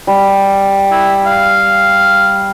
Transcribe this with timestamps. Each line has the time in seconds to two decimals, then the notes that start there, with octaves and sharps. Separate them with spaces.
0.07 G3
0.91 E4
1.26 F5